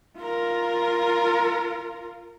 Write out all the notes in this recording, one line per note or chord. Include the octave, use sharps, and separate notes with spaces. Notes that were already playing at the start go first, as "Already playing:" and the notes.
F4 A#4